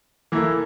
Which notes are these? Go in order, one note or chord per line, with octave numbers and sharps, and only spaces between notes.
E3 A#3 E4 A4